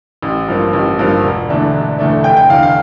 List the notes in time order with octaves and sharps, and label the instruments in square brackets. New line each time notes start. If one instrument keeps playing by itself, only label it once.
[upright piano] A1
G2 F3 A#3
A1
G2 F3 A#3
E1
E2 D3 A3 D4
E1
E2 D3 A3 D4
F1 G5
G5
E2 D3 F5
F5